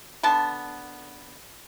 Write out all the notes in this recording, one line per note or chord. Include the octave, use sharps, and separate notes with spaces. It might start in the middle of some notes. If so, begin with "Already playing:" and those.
D3 B3 A5